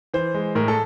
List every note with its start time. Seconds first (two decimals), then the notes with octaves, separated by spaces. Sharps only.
0.13 E3 C5
0.34 G#3
0.55 A2 A#4
0.68 A4